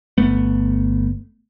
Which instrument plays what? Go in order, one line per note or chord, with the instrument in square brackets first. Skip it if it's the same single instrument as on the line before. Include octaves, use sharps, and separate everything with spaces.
[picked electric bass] G1 A3 B3